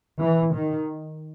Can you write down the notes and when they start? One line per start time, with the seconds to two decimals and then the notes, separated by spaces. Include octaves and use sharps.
0.20 E3
0.53 D#3